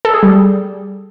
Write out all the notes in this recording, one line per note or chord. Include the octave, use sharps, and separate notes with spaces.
A4
G#4
G3